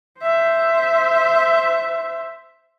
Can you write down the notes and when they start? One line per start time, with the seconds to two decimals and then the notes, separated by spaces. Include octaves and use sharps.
0.20 C5 E5